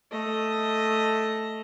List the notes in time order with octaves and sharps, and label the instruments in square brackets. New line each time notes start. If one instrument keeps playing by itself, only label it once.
[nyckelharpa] A3 D#5